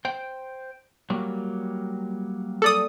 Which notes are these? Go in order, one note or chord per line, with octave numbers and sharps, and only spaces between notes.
C5 G5
F#3 G3 A#3
A4 D5 D#6